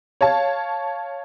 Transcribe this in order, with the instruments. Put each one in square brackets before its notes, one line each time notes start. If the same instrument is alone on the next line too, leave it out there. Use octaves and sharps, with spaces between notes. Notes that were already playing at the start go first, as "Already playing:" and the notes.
[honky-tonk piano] C#5 F5 A5